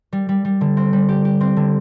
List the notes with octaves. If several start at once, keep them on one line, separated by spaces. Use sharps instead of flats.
G3
G3
G3
D3
C4
G3
G4
G4
C4
D3